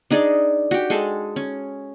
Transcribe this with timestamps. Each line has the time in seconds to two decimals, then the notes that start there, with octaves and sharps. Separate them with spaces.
0.11 D4 D#4 G#4 D5
0.71 F#4 G4
0.90 G#3 G#4 A4
1.36 C#4